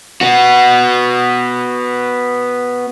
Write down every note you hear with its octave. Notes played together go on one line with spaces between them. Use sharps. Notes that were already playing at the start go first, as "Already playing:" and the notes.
B3 F#4